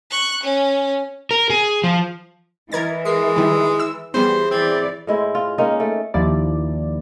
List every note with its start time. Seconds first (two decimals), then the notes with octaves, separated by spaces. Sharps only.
0.10 C#6 F#6
0.43 C#4
1.31 A#4
1.50 G#4
1.84 F3
2.72 E3 A#4 D#5 G#6 A6
3.05 G#3 A#4 C7
3.36 D#3 G3 E4
3.79 E6
4.14 E3 G3 B3 G#4 C5
4.51 E3 C4 D5
5.07 A2 G#3 E4 C5
5.35 F4
5.58 G#3 A#3 C#4 D#4
5.80 A3
6.14 D#2 D#3 F3 A#3 E4 D5